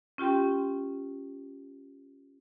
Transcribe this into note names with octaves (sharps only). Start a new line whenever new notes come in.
C#4 F4 G4 G5 C6